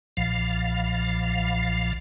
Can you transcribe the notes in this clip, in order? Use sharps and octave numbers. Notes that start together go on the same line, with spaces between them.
B1 A#2 F3 F5